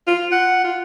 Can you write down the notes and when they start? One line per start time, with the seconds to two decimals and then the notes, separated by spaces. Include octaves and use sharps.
0.07 F4
0.32 F#5
0.64 F4